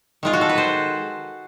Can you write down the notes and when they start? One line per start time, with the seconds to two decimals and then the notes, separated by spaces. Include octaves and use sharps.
0.23 D#3 G#3 F4
0.33 F#4
0.41 A4
0.49 B4
0.58 C5